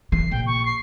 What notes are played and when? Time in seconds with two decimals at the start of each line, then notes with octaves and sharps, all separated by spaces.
0.12 E3 C7
0.31 A#1 G5
0.46 C#6
0.66 C7